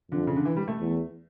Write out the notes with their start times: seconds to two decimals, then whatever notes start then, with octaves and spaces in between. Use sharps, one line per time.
0.11 F2 D3
0.27 C#3
0.36 D3
0.45 E3
0.57 G3
0.68 A3
0.80 E2